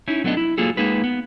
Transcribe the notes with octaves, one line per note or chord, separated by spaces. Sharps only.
C#4 D#4 E4
F#3 A3 B3 D4 D#5
E4
F#3 A#3 F4 G#4 A4
G#3 A#3 D#4 G#4 B4
B3